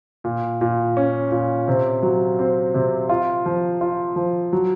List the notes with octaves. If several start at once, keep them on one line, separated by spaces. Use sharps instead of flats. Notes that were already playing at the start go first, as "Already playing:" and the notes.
A#2
A#2
C#4
A#2
C3
F#3
C4
C3
F4
F3
F4
F3
F#3